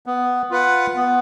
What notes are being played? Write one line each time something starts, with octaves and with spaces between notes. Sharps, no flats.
B3
F4 B4 F#5
B3